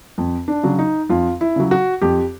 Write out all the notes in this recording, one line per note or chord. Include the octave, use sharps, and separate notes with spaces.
F2
D4
C#3 F#3
D#4
F2 F4
E4
C#3 F#3
F#4
F2 G4